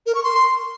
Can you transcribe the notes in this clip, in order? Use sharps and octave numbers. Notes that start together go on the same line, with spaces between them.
A#4
C#6
C6